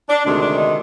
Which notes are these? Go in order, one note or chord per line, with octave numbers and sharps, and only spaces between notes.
D4
D2 C3 D#3 G#3 D4
D4
D#4